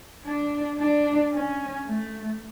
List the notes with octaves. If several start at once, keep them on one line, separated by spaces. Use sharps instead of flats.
D4
D4
C#4
A3